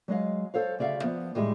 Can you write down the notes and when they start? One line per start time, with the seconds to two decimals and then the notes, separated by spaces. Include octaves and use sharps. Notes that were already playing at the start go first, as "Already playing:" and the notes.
0.08 F#3 G#3 D#5 F5
0.54 A4 C5 C#5 F5
0.79 D2 C#3 D5 E5 F5
1.04 F3 B3
1.35 A2 D#3 G3 G#3